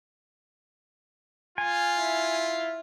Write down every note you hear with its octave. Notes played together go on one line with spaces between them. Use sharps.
F4 G#5
E4